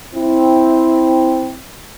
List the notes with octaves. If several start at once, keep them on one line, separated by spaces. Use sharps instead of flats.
C4 E4